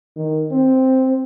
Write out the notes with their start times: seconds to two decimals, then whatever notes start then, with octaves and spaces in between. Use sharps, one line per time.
0.16 D#3
0.52 C4